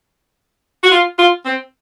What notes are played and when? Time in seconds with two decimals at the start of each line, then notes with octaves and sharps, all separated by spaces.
0.84 F#4
0.92 F4
1.19 F4
1.46 C4